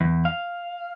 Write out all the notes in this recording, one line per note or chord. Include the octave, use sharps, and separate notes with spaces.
E2
F5